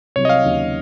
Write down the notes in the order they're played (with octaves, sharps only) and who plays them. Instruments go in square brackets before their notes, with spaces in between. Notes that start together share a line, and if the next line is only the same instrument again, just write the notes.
[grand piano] C2 C3 F#3 [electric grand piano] C#5
[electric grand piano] D#5
F5
[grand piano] D#2 C#3 F#3